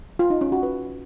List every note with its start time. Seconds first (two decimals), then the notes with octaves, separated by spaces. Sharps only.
0.19 F4
0.30 D#4
0.41 C#4
0.52 F#4
0.63 B4